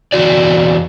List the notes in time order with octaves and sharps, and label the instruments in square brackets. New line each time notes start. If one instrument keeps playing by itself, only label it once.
[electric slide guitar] E2 F#4 D5